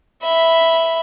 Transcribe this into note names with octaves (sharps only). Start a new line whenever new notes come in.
E5 B5